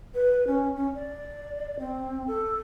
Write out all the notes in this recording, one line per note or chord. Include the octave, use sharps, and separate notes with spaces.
B4
C#4
C#4
D5
C4
A4